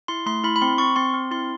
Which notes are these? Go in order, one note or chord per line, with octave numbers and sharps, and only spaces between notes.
E4 C6
A3 C6
E4 B5
B5
C4 C6
C4 C#6
C4 C6
C4
E4 C6